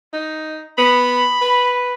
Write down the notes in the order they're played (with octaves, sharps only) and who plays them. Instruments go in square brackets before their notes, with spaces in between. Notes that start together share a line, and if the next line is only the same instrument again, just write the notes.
[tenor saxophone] D#4
[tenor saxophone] B3 [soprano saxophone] B5
[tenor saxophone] B4